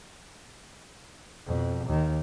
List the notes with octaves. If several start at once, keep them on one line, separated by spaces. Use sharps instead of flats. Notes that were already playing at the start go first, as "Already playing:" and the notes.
F2 B2
D#2 D#3